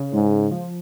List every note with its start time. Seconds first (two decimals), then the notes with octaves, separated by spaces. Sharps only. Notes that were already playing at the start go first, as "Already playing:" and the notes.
Already playing: C#3
0.13 G#2 G#3
0.33 C#3
0.51 F3